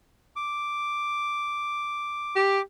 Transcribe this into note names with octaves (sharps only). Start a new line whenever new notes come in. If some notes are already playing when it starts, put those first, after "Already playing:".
D6
G4